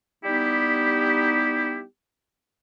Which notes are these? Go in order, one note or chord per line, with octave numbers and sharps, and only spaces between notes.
G3 B3 D#4 E4 G4